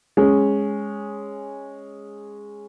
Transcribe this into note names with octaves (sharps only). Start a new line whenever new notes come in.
G#3 C#4